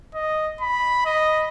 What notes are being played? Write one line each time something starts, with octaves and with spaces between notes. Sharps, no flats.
D#5
B5
D#5